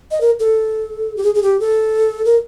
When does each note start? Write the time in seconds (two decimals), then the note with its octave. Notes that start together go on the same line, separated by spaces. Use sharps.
0.11 D#5
0.21 A#4
0.40 A4
1.16 G4
1.23 G#4
1.35 G#4
1.42 G4
1.60 A4
2.25 A#4